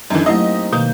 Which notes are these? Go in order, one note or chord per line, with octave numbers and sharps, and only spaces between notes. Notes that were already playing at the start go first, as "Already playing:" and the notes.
F#2 D3 E3 D#4 A5
F#3 A3 A#3 C4 E4 G4 D#5
B2 D#3 A#3 G6